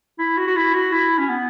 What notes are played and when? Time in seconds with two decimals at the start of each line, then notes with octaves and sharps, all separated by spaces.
0.18 E4
0.37 F#4
0.47 F#4
0.56 E4
0.74 F#4
0.92 E4
1.18 C#4
1.29 B3